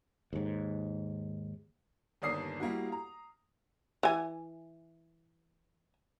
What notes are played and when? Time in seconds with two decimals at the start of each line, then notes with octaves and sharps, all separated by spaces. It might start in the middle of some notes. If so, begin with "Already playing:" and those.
0.33 D#2 G#2
2.22 G1 D#2 D5 D#6 C7
2.60 G3 A#3 E4 F#4
2.92 A#5
4.03 E3 G#5